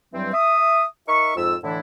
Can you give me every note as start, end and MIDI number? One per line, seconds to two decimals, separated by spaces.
0.13 0.33 43
0.13 0.33 52
0.13 0.33 54
0.13 0.33 55
0.13 0.33 60
0.33 0.84 76
0.33 0.84 87
1.07 1.35 63
1.07 1.35 70
1.07 1.35 76
1.07 1.35 85
1.36 1.56 41
1.36 1.56 44
1.36 1.56 65
1.36 1.56 88
1.63 1.79 45
1.63 1.79 50
1.63 1.79 52
1.63 1.79 62
1.63 1.79 64